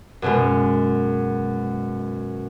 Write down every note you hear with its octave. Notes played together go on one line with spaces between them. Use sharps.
F#2 B2 G#3